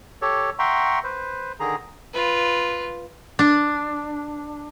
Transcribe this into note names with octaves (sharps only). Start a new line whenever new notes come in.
G4 A4 C#5
E5 F#5 G5 A#5 C6 C#6
B4 C5
D3 D#3 G#4 A#5
F4 B4
D4